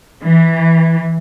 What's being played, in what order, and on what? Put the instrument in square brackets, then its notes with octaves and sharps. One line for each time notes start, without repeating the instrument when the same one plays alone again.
[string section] E3